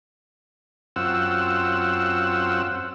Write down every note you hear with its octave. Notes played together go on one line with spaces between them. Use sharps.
F#2 C4 F4 F#5 E6